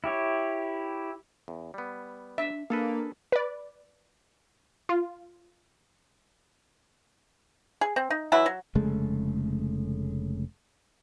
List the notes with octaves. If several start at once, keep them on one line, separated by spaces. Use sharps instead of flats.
E4 G4 C#5
E2
G3 B3
D4 E5
A#3 D4 G#4 A4 B4
B4 D5
F4
G#4
C4
D#4
E3 F#3 E4 F#5
F#3
F1 C#3 G#3 A3